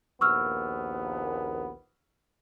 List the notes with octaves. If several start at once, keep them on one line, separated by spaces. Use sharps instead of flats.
A#1 D#2 B3 C#6 E6 F6